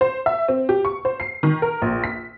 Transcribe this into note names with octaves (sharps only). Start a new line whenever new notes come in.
C5
E5
C4
G4
C#6
C5
C7
D#3
A#4
A#1
B6